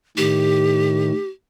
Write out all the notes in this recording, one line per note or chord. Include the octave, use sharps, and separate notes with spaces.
A2 D#3 G4